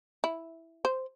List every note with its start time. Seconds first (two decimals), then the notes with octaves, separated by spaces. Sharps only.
0.24 E4
0.85 C5